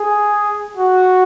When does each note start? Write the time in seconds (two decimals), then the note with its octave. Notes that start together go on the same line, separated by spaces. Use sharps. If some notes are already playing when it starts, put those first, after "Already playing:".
Already playing: G#4
0.77 F#4